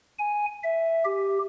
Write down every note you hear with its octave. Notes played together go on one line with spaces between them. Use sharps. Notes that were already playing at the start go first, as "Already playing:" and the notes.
G#5
E5
G4